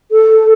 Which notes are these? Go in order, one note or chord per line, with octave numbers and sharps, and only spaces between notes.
A4